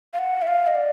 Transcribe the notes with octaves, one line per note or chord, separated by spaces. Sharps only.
F5
F#5
E5
F5
D#5
D5